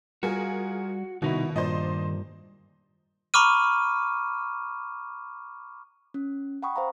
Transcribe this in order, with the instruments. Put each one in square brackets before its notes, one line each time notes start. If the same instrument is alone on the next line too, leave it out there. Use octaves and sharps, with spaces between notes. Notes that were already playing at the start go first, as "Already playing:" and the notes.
[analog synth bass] G3 [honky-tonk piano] F4 G#4 A#4 [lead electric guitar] F#4
[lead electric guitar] C2 D#4 [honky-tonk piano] B2 [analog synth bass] D#3 [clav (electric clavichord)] E4 F#4
[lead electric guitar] G2 [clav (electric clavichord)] A#2 [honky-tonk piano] C5 D5 D#5
[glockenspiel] A#5 B5 C#6 D6 F6 D#7
[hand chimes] C#4
F#5 G5 B5 C#6 D#6
C5 F5 A#5